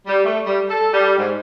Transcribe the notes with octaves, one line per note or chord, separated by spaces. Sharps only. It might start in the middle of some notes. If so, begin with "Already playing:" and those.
G3
A3
G3
A4
G3
G#2